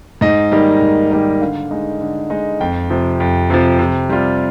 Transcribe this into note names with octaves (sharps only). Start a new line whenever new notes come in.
G#2 D#5
D#3 G3 A#3 D#4
G#2
D#3 G3 A#3 D#4
D3 F5
G#3 D#4
D3
G#3 D#4
F2 G5
C3 F3
F2
C3 F3
C3
G3 C4 F4